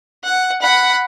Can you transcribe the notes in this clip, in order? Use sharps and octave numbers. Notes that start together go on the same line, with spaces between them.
F#5
F#5 B5